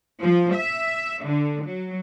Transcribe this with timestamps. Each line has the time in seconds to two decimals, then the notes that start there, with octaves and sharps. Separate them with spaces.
0.22 F3
0.54 E5
1.24 D3
1.66 F#3